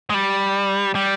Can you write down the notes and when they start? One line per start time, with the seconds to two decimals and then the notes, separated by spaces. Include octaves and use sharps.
0.10 G#3
0.14 G3
0.95 G3